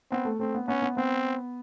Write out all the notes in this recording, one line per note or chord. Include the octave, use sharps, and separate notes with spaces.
B3 C4
A3
A3 C4
B3
B3 C#4
B3
B3 C4